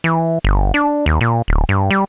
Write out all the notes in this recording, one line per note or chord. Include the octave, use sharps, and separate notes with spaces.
E3
G1
D4
D#2
A#2
D1
G2
G3